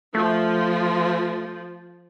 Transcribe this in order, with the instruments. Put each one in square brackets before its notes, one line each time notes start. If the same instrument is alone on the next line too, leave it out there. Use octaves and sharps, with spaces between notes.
[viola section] F3 [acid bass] A3